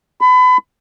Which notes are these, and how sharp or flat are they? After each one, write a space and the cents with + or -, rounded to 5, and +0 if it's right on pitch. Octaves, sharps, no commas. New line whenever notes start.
B5 +30